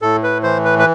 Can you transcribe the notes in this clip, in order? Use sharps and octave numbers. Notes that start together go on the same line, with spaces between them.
A2 A4
B4
E3 C5
B4
B4